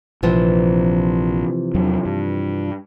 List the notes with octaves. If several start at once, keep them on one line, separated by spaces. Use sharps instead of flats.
A#1 C3 E3 F3
E2 F#3 D4
G2